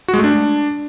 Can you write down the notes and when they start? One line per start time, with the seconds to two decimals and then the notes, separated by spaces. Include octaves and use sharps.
0.08 F#4
0.14 G#3
0.19 A3
0.24 D4